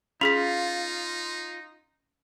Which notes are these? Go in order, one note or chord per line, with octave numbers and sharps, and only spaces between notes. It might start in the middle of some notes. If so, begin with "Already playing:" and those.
C#4 D#4 F4 G#4 B6 F7